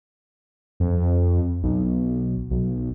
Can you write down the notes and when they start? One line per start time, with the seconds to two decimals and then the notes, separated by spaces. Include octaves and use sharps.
0.80 F2
1.63 B1
2.51 B1